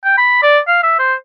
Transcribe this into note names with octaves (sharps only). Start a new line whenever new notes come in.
G5
B5
D5
F5
E5
C5